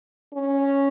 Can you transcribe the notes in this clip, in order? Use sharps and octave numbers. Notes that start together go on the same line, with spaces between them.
C#4